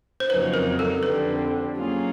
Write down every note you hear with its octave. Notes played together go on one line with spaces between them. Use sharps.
C5
F2 C#3 F#3 A#3 D#4 B4
A#4
A4
F2 D3 G3 C4 B4
F#3 A#3 C#4 F4 G#4